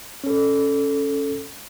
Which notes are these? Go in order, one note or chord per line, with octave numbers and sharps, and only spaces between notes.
C#4 A4